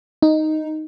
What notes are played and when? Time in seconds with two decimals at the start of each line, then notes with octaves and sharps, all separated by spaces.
0.22 D#4